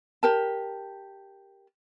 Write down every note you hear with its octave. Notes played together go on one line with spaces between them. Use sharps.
G4 A#4 A5